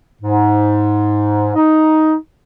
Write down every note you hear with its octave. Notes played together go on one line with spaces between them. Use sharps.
G#2
D#4